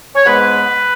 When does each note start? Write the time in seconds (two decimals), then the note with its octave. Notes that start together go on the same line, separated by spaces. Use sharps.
0.15 C#5
0.25 G#2 G#3 B3 B4